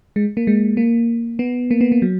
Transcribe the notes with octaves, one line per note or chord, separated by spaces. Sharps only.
G#3
A#3
G#3
A#3
B3
A#3
B3
A#3
F#3